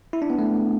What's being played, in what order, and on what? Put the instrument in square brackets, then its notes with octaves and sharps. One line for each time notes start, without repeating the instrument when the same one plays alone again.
[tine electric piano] E4
D4
B3
A3